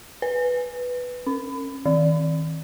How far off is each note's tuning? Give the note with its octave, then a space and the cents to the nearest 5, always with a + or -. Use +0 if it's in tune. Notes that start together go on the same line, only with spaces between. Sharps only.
B4 +0
C#4 -30
D#3 +35